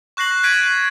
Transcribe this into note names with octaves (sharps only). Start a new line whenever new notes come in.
C#6 F#6 A#6 C7 F#7
F#6 G#6 B6 D7 D#7